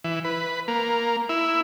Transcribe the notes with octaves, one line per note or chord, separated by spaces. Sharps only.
E3
B4
A#3
E4